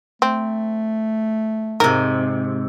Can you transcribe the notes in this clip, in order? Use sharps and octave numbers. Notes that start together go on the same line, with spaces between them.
A3 C4
G#2 C3 A#4